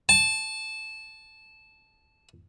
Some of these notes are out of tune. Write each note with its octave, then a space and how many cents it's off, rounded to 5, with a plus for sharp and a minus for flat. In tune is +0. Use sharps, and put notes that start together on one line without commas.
A5 -10